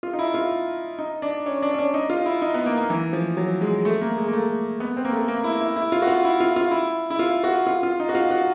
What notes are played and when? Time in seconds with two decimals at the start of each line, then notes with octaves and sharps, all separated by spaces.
0.03 F4
0.13 D#4
0.19 E4
0.34 F4
0.99 D#4
1.22 D4
1.46 C#4
1.62 D4
1.74 C#4
1.78 D4
1.94 D#4
2.10 F4
2.26 E4
2.42 D#4
2.54 B3
2.66 A#3
2.77 A#3
2.90 E3
3.13 F3
3.37 F#3
3.61 G#3
3.85 A3
4.01 A#3
4.17 G#3
4.28 A#3
4.33 A3
4.80 B3
4.97 C4
5.05 A#3
5.12 A3
5.28 A#3
5.44 E4
5.60 E4
5.76 E4
5.92 F4
6.02 F#4
6.08 F4
6.24 E4
6.40 F4
6.56 F4
6.71 E4
7.10 E4
7.19 F4
7.44 F#4
7.67 F4
7.83 F4
8.00 D#4
8.09 F#4
8.15 F4
8.31 F#4